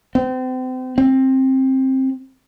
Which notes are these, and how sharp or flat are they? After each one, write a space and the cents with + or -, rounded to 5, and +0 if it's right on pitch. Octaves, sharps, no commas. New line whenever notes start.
C4 -35
C4 +15